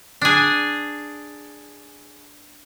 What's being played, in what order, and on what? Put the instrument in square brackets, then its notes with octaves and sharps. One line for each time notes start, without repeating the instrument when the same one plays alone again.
[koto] D4 G#4